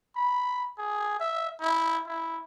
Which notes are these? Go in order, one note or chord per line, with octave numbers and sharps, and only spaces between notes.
B5
G#4
E5
E4
E4